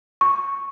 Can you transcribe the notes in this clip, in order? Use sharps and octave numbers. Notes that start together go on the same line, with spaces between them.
C#6